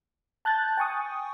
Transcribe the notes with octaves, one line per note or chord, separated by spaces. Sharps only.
A5 F#6 G6 A6
G5 G#5 C#6 D#6